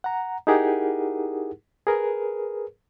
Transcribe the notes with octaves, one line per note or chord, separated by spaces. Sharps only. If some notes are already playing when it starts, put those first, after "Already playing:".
F#5 A#5
D#4 E4 G4 G#4 A#4 F#5
G#4 A#4 B4